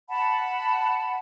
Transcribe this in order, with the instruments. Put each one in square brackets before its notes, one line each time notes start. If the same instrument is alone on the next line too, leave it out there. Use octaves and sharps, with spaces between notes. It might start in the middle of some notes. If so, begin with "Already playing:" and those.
[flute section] F#5 A5 B5